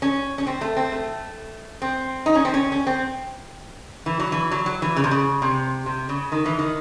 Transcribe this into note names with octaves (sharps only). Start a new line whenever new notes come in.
C#4
C#4
C4
A3
C4
A3
C4
D#4
C#4
C4
C#4
C#4
C4
E3
F#3
E3
F#3
F#3
E3
C#3
C3
C#3
C3
C3
C#3
D#3
E3
D#3